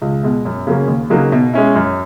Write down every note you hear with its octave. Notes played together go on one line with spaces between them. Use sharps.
C#2
B2 G#3
F#2
C#3 F#3 A#3 C#4
D#2
C#3 F#3 A#3 D#4
B2
G#3 C#4 E4
F#2